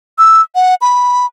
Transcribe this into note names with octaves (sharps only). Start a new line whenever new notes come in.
E6
F#5
B5